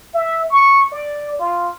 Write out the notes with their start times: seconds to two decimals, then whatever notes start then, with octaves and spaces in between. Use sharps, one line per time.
0.14 E5
0.50 C#6
0.92 D5
1.39 F4